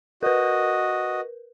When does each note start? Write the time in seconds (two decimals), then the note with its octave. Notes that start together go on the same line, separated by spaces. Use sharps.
0.23 F#4 A#4 B4 D#5